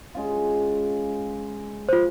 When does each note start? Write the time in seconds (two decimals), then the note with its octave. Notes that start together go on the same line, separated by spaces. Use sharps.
0.15 G#3 C#4 F4
1.89 F4 C5